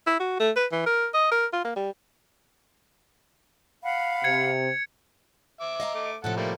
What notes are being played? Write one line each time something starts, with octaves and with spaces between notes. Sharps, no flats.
E4
F#4
A3
B4
E3
A#4
D#5
A#4
F4
A#3
G3
F5 F#5 B5
C3 G#6 C#7
E5 D6
D#5 F5 A#5
A3 D6
A2 C3 F3 A4 F#5 A5
G3 A3 A#3